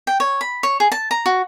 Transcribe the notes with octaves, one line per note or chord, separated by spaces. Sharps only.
G5
C#5
B5
C#5
G#4
A5
A#5
F#4